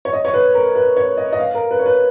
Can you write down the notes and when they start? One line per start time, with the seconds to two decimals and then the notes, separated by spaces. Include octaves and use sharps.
0.05 C#5
0.13 D#5
0.25 C#5
0.34 B4
0.54 A#4
0.76 B4
0.97 C#5
1.17 D#5
1.32 D#5
1.39 F5
1.54 A#4
1.71 B4
1.79 C#5
1.86 B4